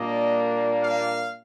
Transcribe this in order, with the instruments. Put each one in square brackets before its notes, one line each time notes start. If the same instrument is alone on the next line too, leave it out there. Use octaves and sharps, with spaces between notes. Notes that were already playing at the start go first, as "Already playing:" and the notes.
Already playing: [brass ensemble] A#2 G3 A#3 D4 D#5
F5